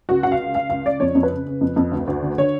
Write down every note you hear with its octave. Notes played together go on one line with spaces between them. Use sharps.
C#2 F#4
C#2 F#5
F5
C#3
C#3 F5
C#2 F5
C#2 D5
F2 C#5
F2
B4
C#3
C#3
F2
F2
D2
D2
D3
D3 C#5